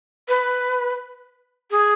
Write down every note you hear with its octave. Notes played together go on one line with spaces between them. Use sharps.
B4
G#4